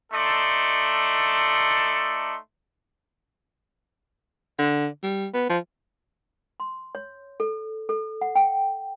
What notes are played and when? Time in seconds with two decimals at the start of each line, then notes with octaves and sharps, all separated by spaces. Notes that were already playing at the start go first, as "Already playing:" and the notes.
0.13 A3 D#4 A4 D5 C6
4.59 D3
5.03 G3
5.34 B3
5.50 F3
6.60 C6
6.95 C#5
7.40 A4
7.89 A4
8.21 F#5
8.35 G5